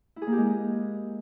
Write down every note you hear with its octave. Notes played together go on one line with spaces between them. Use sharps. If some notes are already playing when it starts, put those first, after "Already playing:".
E4
G#4
A#3
G4
G#3